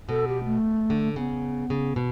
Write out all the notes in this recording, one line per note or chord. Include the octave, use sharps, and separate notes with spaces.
B2 A4
G4
A3
D3
C#3 B3
C#3
B2